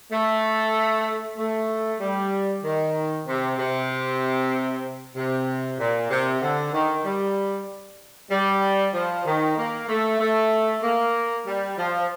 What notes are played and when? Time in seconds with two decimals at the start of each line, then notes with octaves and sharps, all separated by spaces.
0.11 A3
1.37 A3
2.00 G3
2.63 D#3
3.26 C3
3.58 C3
5.15 C3
5.78 A#2
6.10 C3
6.42 D3
6.73 D#3
7.05 G3
8.30 G3
8.94 F3
9.25 D#3
9.57 A#3
9.88 A3
10.20 A3
10.83 A#3
11.46 G3
11.78 F3